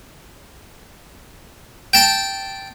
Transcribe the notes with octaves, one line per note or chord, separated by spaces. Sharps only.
G5 A5